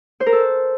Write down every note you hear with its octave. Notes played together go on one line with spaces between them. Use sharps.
C5
A#4
A4